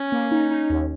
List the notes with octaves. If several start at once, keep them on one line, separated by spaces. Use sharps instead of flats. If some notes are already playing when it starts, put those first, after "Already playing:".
Already playing: C#4
A#3
D#4
D#4
D#2